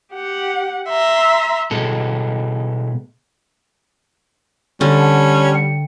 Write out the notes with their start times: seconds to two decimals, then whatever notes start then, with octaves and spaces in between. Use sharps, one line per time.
0.12 G4 F#5
0.89 E5 A#5 C6
1.71 B2 G#3 A4
4.81 D3 G3 C#4
4.98 F#5 A5
5.54 G5 C#7